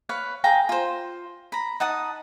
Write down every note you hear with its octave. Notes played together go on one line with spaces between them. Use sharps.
B4 C#5 F5
G#4 F5 G5 A#5
F4 C5
A#5 B5
D#4 F#5 A5 D#6